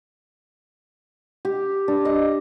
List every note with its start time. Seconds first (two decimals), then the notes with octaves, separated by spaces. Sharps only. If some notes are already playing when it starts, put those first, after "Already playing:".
1.45 G4
1.88 D4
2.05 D#5